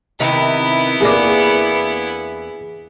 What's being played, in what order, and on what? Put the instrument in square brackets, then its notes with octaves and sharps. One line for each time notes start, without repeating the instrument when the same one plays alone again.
[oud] C3 D#3 D#4 [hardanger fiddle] B3 E4
[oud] E2 A#3 D4 [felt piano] G#4